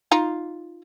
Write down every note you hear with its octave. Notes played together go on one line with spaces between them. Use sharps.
D#4 F4 A#5